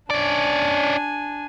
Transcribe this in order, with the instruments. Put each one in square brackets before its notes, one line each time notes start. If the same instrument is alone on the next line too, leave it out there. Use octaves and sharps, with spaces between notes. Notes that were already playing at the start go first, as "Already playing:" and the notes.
[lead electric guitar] C#4 D5 [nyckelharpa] D4 G#5